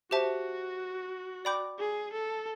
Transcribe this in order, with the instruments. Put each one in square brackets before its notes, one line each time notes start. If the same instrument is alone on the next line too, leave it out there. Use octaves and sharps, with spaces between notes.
[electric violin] F#4 [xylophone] G4 C5 E5 A5
[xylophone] D5 G5 B5 D6 G6
[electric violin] G#4
A4